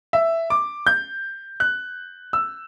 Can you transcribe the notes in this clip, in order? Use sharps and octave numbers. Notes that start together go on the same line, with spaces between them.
E5
D6
G6
F#6
E6